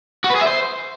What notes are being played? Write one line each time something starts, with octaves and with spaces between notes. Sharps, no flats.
F#4
B4
G#4
E5
C5